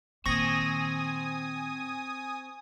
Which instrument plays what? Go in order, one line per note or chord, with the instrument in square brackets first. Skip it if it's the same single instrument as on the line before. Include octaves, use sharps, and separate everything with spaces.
[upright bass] A#2 D#3 [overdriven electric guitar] C4 [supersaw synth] G#5 D#6 [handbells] C#6 A#6